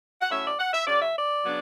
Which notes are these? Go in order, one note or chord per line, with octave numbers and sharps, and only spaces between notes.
F#5
A2 F#3 A3 C#4 E5
D5
F#5
E5
C#3 F#3 C#4 D5
E5
D5
C#3 F#3 B3 D4